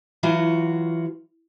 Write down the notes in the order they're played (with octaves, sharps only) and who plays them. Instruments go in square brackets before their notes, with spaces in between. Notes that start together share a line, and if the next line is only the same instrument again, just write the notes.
[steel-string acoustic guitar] E3 F#3 F4 F#4